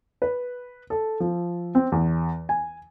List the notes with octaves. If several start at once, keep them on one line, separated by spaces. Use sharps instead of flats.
B4
A4
F3
C4
E2
G#5